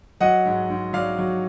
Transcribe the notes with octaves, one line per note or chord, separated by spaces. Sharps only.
F#3 D#5 F#5
G#2
G#2
F#3 D5 F5
F#3